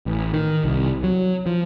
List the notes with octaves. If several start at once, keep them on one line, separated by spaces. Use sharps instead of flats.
A1
D#3
C2
F#3
F3